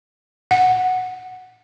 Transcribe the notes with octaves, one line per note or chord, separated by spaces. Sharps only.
F#5